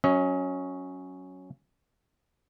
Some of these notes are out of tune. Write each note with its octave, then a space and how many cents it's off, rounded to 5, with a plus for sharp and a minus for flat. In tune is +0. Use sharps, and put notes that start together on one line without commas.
F#3 +0 C#4 +0 D#5 +45